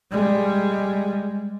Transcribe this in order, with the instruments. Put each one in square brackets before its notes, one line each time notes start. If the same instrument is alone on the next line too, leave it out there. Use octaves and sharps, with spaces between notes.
[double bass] G3 G#3